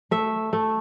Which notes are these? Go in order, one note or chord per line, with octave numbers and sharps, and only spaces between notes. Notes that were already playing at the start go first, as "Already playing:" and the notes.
A3 E5
A3